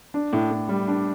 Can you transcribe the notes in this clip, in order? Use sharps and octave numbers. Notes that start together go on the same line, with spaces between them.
D4
A2
A2
G3
D4